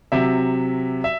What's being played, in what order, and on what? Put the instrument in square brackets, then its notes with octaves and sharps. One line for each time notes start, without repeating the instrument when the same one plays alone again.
[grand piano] C3 F#3 E5
E5